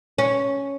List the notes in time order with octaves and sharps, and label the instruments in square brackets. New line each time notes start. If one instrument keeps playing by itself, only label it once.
[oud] C#4